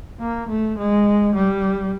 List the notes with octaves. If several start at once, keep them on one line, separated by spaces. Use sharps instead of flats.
A#3
A3
G#3
G3